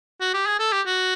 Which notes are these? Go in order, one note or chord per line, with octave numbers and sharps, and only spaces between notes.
F#4
G4
G#4
A4
G4
F#4